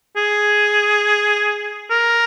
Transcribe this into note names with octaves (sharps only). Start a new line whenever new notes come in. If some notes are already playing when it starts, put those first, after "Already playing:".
G#4
A#4